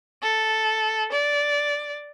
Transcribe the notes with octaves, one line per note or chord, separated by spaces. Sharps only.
A4
D5